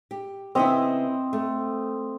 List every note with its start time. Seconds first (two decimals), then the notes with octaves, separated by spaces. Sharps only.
0.11 G4
0.55 C#3 B3 C4 E4 D#5
1.33 A3